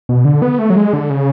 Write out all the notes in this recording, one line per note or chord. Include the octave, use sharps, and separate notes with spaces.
B2
D3
B3
A3
F#3
G#3
D3
C#3